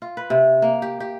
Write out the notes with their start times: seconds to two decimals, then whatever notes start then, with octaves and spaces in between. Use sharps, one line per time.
0.02 F4
0.17 B4
0.30 C3
0.62 A#3
0.82 G4
1.00 G4